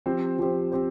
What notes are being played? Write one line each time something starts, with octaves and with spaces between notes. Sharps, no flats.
F3 C4 G4 C5
F3 C4 G4 C5
C4 G4 C5